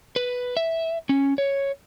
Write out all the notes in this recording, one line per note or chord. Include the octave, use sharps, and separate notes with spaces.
B4
E5
C#4
C#5